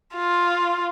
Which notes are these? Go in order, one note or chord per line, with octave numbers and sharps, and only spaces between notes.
F4